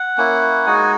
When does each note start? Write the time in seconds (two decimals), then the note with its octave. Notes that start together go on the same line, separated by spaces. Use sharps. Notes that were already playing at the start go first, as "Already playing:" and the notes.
Already playing: F#5
0.18 A#3 C#4 E4
0.66 G#3 D#4 F#4 G#5